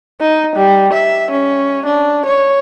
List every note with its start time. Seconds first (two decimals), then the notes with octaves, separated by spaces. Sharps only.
0.21 D#4
0.56 G3
0.93 E5
1.31 C#4
1.86 D4
2.26 C#5